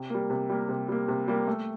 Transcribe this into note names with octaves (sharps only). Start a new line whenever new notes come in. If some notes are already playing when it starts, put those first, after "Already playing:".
Already playing: C3
G3 A#3
C3
G3 A#3
C3
G3 A#3
C3
G3 A#3
A3